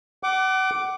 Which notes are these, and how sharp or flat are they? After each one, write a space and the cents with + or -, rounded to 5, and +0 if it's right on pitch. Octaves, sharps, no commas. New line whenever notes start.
F#5 +35 D6 +0